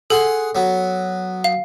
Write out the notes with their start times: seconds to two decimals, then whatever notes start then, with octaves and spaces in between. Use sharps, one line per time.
0.10 G#4 A4 F#5 C6
0.55 F#3 B3
1.44 F5